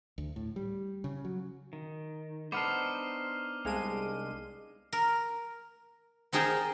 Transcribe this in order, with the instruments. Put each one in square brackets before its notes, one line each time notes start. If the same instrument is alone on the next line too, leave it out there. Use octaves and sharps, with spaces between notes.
[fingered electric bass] D2
A2
G3
C#3
F#3
[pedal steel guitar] D#3
[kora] B3 D4 [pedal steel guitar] D#4 C5 [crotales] D6 F6 C7
[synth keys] C2 G#3 D#7 [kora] D4 F5
[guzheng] A#4
C4 D#4 G#4 A#4 G5 A5